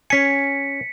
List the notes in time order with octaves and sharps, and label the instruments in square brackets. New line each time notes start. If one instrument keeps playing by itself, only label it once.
[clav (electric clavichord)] C#4 G#5 [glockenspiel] B6 C#7